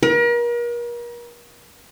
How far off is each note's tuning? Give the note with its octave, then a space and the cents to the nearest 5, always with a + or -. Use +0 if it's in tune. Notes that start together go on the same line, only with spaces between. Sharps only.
A#4 +40